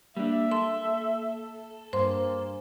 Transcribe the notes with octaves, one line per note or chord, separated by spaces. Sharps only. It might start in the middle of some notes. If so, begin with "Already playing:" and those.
G3 A#3 D4 E5
A4 C6
G2 A#3 C5 G#5 C6